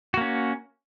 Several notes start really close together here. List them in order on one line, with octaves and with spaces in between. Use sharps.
F#4 A#3 C#4